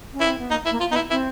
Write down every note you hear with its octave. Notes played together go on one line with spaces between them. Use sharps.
C#4
E4
C4
B3
A#3 D#4
E4
A#3
F4
B3 D#4
E4
C4 E4